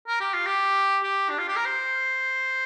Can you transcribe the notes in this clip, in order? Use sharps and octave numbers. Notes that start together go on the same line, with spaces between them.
A#4
G4
F4
G4
G4
D4
F4
G4
A#4
C5